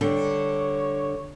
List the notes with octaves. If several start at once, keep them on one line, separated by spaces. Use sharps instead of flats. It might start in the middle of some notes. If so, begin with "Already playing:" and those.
D3 G3 C#5